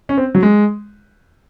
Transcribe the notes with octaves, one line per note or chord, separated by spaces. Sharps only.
C#4
C4
F#3
G#3